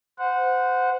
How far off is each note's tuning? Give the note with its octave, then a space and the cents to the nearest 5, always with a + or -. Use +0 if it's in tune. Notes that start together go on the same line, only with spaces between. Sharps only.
C5 -25 F#5 -15